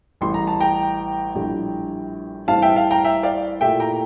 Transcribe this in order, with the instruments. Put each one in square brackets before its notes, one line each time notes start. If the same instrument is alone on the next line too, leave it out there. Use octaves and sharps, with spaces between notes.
[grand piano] A1 A2 G3 [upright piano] C6
[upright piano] A#5
A5
G5 A#5
[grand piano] A#1 A2 G3 D4 G4
[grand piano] A1 A2 E3 G3 C4 [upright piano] F5 A5
[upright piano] E5 G5
F5 A5
G5 A#5
E5 G5
D5 F5
[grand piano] A#2 A3 E4 G4 [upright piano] E5 G5
[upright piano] G5 A#5